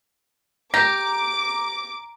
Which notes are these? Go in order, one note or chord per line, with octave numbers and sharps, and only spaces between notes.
G4 A#5 D6 A#6